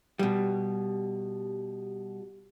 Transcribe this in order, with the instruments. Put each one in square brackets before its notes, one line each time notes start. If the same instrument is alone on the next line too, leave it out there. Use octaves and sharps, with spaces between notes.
[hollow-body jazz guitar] B2 G3